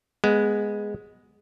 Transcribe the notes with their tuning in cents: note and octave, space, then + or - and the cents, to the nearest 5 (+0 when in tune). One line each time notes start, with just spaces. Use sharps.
G#3 +0 B3 +0